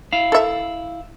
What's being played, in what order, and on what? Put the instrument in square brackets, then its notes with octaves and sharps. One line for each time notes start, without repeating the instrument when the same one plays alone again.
[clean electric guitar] E4 F5
[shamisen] A4 E5